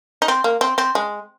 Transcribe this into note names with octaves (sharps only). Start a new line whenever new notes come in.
D#4
C4
A#3
C4
C4
G#3